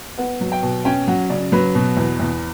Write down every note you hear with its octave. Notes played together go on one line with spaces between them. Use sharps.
B3 F#5
F#3
G5
B2
C#4 G5
F#3 F#5
C#3 D5
F#3 B4
B2
E2
E2